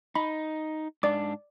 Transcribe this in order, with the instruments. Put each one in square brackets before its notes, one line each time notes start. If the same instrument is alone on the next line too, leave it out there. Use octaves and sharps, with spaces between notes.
[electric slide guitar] D#4 [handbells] B5
[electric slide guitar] G#2 D4 [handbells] D5 D6